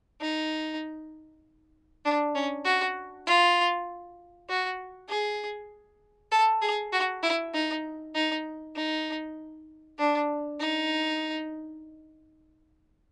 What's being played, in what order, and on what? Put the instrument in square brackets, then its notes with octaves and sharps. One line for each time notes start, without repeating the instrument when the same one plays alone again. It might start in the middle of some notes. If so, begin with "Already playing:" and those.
[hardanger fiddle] D#4
D4
C#4
F#4
F4
F#4
G#4
A4
G#4
F#4
E4
D#4
D#4
D#4
D4
D#4